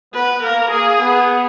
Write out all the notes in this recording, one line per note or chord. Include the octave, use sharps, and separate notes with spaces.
B3 B4
A#3 A#4
A#3 G#4
B3